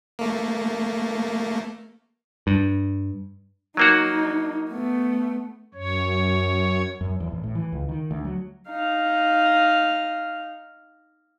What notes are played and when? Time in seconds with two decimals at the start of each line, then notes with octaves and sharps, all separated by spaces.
0.19 A3 A#3
2.47 G2
3.77 F#3 A#3 D#4 F#4
4.71 A3 B3
5.74 F#2 C#5
7.01 F#2
7.20 E2
7.32 A1
7.44 A2
7.55 E3
7.72 C#2
7.89 D#3
8.11 D2
8.25 F#3
8.70 D#4 F5